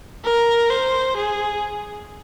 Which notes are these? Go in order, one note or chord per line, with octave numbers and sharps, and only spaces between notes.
A#4
C5
G#4